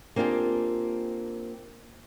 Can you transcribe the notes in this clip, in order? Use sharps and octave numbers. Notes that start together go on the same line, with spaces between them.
A#3 C4 D4 F4 G4 G#4